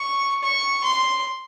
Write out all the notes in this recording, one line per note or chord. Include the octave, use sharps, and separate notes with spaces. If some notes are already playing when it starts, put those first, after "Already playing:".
Already playing: C#6
C#6
C6